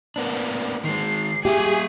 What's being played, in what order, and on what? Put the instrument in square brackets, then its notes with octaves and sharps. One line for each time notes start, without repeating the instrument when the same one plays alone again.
[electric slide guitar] A#3 B3 D4
[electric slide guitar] D#3 G#3 [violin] C7
[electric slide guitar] A#3 E5 [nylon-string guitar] G4 [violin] G#4